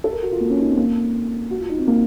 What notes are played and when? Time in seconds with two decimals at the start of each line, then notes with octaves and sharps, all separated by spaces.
0.04 A4
0.13 A#4
0.22 F#4
0.32 F4
0.40 A#3
0.50 C#4
0.59 D#4
0.68 C4
0.77 A#3
1.51 F#4
1.60 F4
1.69 D#4
1.78 C4
1.87 A#3